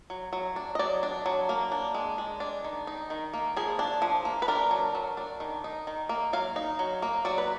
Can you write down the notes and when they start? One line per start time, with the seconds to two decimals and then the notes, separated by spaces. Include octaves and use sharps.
0.10 F#3
0.33 F#3
0.56 D4
0.75 D#5
0.79 F#3 D5
1.03 D4
1.26 F#3
1.49 A#3
1.72 D4
1.94 G#3
2.18 G#3
2.40 D4
2.64 D#3
2.87 D#4
3.10 D#3
3.34 A#3
3.57 F3 G#4
3.79 D4
4.02 F3
4.25 A#3
4.42 B4
4.48 D4 A#4
4.71 F#3
4.95 F#3
5.17 D4
5.40 D#3
5.64 D#4
5.87 D#3
6.09 A#3
6.33 F#3 F5
6.56 D#4
6.79 F#3
7.02 A#3
7.25 F#3 D5
7.38 B4